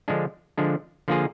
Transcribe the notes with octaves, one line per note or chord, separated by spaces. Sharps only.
D3 F3 G#3 D4
D3 F3 G#3 D4
D3 F3 A#3 F4 G#4